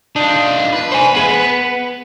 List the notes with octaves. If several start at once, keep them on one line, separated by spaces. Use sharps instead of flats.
D4 D#4 F4
B4
C5 G#5
B3 G#4
B3